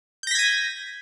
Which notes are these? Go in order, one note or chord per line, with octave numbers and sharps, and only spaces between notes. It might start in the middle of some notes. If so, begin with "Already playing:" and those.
G6 G#6 A#6 B6 D#7